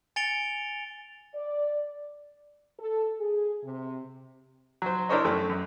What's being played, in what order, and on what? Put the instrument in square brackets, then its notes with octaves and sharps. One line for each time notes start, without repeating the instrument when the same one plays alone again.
[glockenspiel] G#5 A6 C#7 D7 F7 G7
[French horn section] D5
A4
G#4
C3
[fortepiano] F#3 C5
D4 E4 A#4 C5 C#5 D#5
F#2 A3 G5
F#2